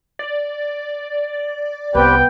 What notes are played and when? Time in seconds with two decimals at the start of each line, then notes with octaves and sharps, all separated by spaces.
0.19 D5
1.95 C2 B3 C4 G4 B4 G5